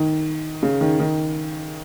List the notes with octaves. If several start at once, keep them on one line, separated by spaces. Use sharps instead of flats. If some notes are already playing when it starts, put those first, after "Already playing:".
Already playing: D#3
C#3
D#3
D#3